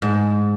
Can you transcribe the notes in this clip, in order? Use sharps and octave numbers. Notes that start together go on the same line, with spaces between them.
G#2